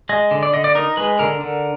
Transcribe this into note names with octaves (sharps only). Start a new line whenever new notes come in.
G#3 D#5
D3
D5
D3 D#5
D5
D#4 A#4
G#3 B4
D3 A#4
D3